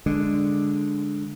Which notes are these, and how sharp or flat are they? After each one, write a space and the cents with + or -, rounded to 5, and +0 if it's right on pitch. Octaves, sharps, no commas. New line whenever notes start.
D3 +0 G#3 +0 D4 +0